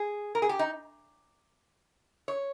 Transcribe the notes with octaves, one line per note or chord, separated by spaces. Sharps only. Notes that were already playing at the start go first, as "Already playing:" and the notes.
Already playing: G#4
A#4
G#4
G4
D#4
C#5